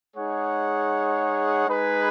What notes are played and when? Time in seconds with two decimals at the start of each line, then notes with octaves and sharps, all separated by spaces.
0.16 G#3 D#4 G#4 C#5 F#5
1.66 G#3 D#4 G#4 B4